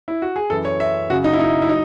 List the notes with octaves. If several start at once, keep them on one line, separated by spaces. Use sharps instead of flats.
E4
F#4
G#4
F#2 E3 A4
C#5
E5
F#2 C#3 F#3 F#4
D#4
E4
D#4
E4
F#3 D#4